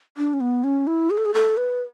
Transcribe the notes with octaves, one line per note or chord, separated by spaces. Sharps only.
D4
C#4
B3
C#4
E4
G#4
A4
G#4
A4
B4